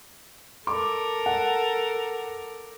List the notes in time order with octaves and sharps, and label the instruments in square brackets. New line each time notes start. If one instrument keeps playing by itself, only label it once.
[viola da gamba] A4 A#4 [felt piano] D6
[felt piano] F#5